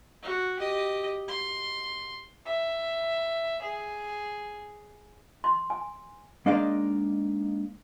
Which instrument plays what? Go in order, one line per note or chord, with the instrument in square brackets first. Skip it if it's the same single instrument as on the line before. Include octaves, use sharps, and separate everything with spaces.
[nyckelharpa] F#4
G4 D#5
C6
[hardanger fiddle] E5
G#4
[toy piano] C6
G#5
[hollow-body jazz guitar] G#3 A#3 D4 D#4 D5 F5